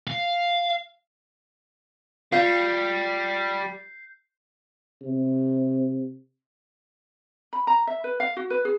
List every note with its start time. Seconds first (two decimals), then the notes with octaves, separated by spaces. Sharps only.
0.07 F5
2.32 G3 F4 F5 G6 C7
5.03 C3
7.53 B5
7.67 A#5
7.87 E5
8.04 B4
8.20 F5
8.37 F#4
8.50 B4
8.65 G#4